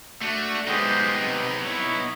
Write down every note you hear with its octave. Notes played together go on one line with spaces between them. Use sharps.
A3 D4 F#4
G#3 B3 D#4 G4 C5
C3
E4 C#5